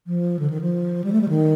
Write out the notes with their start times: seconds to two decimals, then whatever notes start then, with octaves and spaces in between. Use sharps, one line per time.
0.07 F3
0.39 D3
0.50 D#3
0.61 F3
1.04 G3
1.12 A3
1.21 G3
1.29 D#3